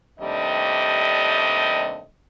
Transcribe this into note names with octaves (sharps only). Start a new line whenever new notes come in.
D#2 C3 G3 A3 D4 D#5